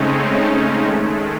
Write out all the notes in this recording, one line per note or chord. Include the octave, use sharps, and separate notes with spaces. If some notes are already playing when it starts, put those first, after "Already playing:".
Already playing: C#3 G#3 A3 C4 C#4 D#4
A3 C#4
C4
D#3 G#3 A3